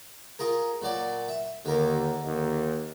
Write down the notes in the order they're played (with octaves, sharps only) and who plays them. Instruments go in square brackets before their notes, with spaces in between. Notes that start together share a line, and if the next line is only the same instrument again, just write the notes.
[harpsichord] F4 G#4 A#4
A#2 F#3 D5
E5
[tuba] D#2 [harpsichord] D3 A#4
[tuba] D#2